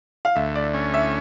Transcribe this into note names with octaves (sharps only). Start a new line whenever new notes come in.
F5
D2 E5
D5
C#4
E5